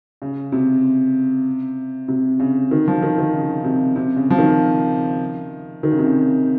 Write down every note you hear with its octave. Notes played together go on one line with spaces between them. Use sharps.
C#3
C3
C3
C#3
D#3
F3
D#3
D#3
C#3
C3
C3
C#3
F3
D#3
D#3
C#3
C3
C#3